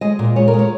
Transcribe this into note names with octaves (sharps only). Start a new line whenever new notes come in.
G#3 D#5
A#2
G#3 C#5
A#4
G#3
C#5